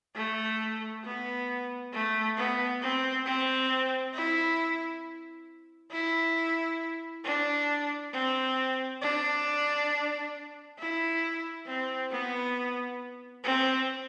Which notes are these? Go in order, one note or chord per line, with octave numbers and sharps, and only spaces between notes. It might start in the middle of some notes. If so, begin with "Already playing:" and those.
A3
B3
A3
B3
C4
C4
E4
E4
D4
C4
D4
E4
C4
B3
C4